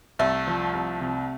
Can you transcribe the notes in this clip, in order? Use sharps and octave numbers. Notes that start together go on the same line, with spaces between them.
C2 A3
F3
C2
C3